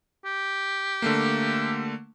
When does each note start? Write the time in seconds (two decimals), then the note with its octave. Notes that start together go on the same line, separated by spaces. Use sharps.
0.25 G4
1.02 D3 A3 A#3